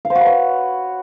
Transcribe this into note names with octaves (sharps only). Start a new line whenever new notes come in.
F5
C5
F#4
B4
C#5